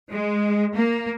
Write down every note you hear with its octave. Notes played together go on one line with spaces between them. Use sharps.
G#3
A#3